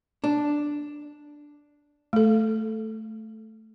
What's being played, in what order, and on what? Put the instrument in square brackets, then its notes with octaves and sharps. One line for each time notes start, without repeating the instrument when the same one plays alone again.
[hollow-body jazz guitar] D4
[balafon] A3 A4